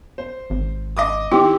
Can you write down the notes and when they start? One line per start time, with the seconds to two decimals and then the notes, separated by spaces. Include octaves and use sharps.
0.18 C5
0.50 G#1
0.97 D#5 D6 D#6
1.32 D#3 C4 E4 G4